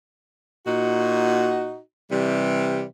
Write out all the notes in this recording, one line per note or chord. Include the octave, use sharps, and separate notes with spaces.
A#2 D#4 F#4
C3 E3 G3